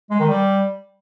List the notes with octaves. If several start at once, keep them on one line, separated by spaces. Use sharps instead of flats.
G#3
D#3
G3